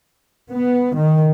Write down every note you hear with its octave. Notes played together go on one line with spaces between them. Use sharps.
B3
D#3